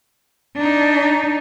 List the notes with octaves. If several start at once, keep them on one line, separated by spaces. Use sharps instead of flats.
D4 D#4